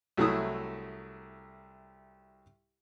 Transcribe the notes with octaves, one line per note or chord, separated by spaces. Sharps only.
C2 F#3 A3 E4 D#6